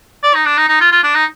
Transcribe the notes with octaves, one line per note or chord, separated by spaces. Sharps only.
D5
D#4
D4
D#4
D#4
F4
F4
D4
D#4